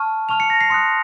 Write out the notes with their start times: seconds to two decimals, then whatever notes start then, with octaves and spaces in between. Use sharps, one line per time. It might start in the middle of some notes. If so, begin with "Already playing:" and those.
Already playing: A5 C#6 F6
0.29 A5 C#6 F6 F7
0.40 C#7
0.50 A#6
0.61 C7
0.70 C6 D#6 F#6 C#7